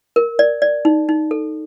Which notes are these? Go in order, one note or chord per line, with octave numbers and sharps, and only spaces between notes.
A#4
D5
D5
D#4
D#4
A4